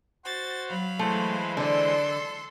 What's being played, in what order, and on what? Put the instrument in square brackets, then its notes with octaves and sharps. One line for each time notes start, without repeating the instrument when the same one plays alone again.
[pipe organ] F#4 C5 [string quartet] A6
[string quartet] F#3 F5 B5
[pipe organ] E3 G#3 C5 [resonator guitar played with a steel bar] A3
[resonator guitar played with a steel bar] D3 D5 [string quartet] A4 C6